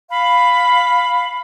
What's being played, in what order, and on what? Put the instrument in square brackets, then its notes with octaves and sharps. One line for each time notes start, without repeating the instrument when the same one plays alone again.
[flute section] F5 B5